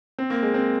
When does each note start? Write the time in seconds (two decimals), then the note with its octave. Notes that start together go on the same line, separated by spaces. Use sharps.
0.19 C4
0.30 A#3
0.43 G#3
0.54 C4